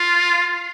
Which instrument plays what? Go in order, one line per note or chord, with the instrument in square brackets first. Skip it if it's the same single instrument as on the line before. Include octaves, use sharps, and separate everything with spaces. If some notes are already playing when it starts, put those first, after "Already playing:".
Already playing: [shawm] F4